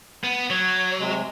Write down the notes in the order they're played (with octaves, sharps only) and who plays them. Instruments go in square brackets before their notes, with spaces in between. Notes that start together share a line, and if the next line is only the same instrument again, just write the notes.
[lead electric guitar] B3
[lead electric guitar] F#3 [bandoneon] C#5
[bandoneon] C3 G#3